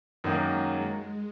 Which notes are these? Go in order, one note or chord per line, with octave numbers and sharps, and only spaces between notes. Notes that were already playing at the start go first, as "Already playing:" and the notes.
F#2 D#3 F#3 G#3 A#3